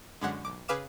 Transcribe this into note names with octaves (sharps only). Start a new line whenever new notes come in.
F#2 D3 G#3 C#4 F#5
B1 D6
C#3 G#4 B4 F5 D6 E7